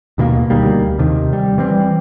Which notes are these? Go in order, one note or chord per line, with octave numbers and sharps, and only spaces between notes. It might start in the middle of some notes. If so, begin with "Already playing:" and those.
D#2 B2 G3 A#3
D2 D#3 G3 A#3
D#2 C3 D#3
G3
E3 G3 C4